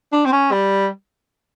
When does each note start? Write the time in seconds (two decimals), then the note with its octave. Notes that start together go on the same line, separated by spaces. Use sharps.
0.12 D4
0.25 C4
0.32 C#4
0.52 G3